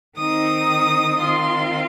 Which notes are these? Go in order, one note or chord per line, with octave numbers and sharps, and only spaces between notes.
D#3 C4 D#4 D#6
D#3 C4 F4 C6